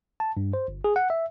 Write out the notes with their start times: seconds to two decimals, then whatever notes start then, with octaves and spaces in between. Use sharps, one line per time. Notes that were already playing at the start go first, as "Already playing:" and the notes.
0.20 A5
0.37 G2
0.53 C5
0.68 G1
0.84 G#4
0.96 F#5
1.10 E5